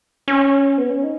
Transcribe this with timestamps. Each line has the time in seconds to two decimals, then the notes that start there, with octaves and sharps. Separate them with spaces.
0.28 C#4
0.78 B3
0.90 C#4
1.04 D#4